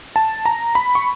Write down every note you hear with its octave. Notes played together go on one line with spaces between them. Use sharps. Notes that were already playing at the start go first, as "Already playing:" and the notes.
A5
A#5
B5
C#6